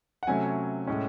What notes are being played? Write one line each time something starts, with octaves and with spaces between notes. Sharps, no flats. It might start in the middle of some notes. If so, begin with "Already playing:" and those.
F#5
C3 F#3 A3 C#4 G#5
A2 G#3 C#4